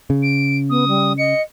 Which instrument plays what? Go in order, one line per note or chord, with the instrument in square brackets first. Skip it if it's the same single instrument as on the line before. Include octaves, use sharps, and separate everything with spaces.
[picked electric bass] C#3
[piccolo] D7
[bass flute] B3 [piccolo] D#6
[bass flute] G3
[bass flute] D#5 [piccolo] C#7